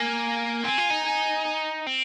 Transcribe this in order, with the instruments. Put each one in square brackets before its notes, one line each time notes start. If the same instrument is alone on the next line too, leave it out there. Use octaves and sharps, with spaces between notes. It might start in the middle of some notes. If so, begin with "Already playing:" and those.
Already playing: [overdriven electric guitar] A#3 [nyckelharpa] G#5
[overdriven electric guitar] C4 [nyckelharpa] G#5
[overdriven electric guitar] F4
D#4
[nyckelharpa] G#5
[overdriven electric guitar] C4